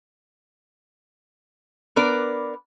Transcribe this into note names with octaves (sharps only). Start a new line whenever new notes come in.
B3 D4 A#4 B4 D5